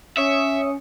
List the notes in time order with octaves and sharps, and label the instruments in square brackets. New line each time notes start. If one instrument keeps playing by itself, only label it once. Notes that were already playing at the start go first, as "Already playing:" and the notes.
[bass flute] C#4 [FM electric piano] C#5 D#6 C#7 [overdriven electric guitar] E5